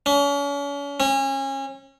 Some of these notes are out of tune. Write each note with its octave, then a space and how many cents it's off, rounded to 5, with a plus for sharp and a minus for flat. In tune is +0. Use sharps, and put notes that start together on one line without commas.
C#4 +40
C#4 -30